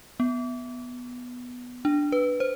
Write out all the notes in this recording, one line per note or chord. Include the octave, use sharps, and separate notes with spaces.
B3
D4
B4
C5